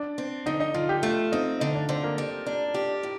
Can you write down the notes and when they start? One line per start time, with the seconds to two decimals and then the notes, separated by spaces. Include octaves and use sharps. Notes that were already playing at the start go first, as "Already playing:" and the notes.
Already playing: D4 D5
0.18 C4
0.46 D3 D#4 D#5
0.60 D#4 D#5
0.74 D3 F4 F5
0.89 G4 G5
1.03 A3 F4 F5
1.32 C4 D#4 D#5
1.60 D3 D#4 D#5
1.75 D4 D5
1.89 D3 C4 C5
2.03 A#3 A#4
2.18 G3
2.46 D4
2.74 G4
3.03 A2